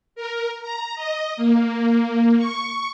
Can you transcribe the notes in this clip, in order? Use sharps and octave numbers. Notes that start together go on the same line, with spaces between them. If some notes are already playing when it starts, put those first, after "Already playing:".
A#4
A#5
D#5
A#3
C#6